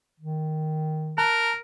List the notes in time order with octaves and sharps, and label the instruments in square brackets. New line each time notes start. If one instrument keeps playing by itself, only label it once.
[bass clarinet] D#3
[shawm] A#4 [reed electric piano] A5 A#5 F#6